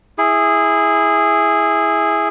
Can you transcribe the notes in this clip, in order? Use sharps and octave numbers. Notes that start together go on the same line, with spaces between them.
E4 G#4